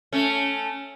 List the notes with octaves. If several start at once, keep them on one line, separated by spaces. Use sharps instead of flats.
A3 C#4